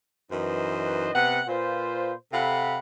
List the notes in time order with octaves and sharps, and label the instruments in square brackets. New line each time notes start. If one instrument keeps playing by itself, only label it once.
[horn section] F#2 E3 D#4 B4 C5 D#5
C3 B3 B4 F#5
A#2 F4 B4 C5
C3 A4 F5 F#5 B5